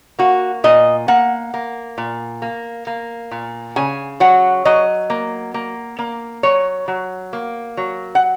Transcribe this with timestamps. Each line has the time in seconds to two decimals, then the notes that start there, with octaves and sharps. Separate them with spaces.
0.19 A#3 F#4
0.64 A#2 D#5
1.08 A#3 F#5
1.54 A#3
1.98 A#2
2.42 A#3
2.87 A#3
3.31 A#2
3.76 C#3 G#5
4.20 F#3 F#5
4.65 F#3 D#5
5.10 A#3
5.54 A#3
5.99 A#3
6.43 F#3 C#5
6.88 F#3
7.33 A#3
7.77 F#3
8.15 F#5